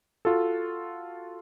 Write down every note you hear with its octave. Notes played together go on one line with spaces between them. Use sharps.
F4 F#4 A4